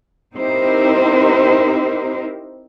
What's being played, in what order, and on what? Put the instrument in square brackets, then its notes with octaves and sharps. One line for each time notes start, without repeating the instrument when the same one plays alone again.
[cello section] C4 D#4 E4 G4 A#4 C5